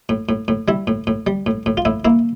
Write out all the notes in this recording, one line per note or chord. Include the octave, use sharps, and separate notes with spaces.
A2
A2
A2
G3 E4
A2
A2
G3
A2
A2
F4
A2 E4
A#3 E4